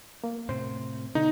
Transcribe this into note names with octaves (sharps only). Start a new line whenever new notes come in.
A#3
A2 C3 C5
B2 D3 D#4